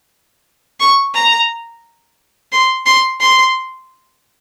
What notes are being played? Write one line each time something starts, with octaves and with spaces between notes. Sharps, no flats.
C#6
A#5
C6
C6
C6